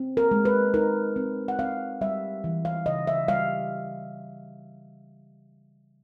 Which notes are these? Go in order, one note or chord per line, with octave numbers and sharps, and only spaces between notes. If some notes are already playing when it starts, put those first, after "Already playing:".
Already playing: C4
A#4
G#3
B4
D#4 A#4
C4
F#5
C4 F5
G3 E5
E3
F5
C#3 D#5
E5
G3 F5